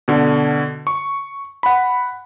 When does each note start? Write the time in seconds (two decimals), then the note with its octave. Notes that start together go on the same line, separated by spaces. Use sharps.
0.08 B2 D3
0.87 C#6
1.63 F#5 B5